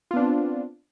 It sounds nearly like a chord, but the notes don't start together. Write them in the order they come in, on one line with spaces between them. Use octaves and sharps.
F4 B3 D4 C4